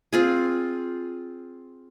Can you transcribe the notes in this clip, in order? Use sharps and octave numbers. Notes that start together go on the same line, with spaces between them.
C4 F4 G#4